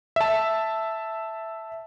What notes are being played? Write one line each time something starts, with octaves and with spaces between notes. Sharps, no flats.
E5 A5